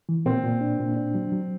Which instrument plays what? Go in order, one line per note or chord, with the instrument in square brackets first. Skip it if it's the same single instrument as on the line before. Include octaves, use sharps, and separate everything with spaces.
[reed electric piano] E3
[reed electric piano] A#2 [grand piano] C4
[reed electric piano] A#2
D4
A#2
D4
F#3
F#3